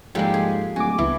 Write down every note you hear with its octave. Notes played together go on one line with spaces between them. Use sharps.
F2 G#2 G3 G#3 A#3 G4 A4
G#4
D1 F#4 G#5 D6
G1 C#2 E3